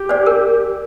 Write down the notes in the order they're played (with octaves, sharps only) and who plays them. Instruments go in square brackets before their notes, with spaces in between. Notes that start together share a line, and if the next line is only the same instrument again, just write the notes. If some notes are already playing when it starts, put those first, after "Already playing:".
Already playing: [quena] G4
[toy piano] C5 D5
A#4